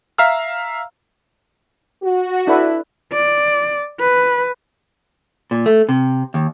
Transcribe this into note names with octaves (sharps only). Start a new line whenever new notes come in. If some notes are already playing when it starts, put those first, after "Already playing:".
E5 F5 A#5 E6 F6
F#4
D4 E4 A4 B4
D5
B4
A#2
A3
C3
D#2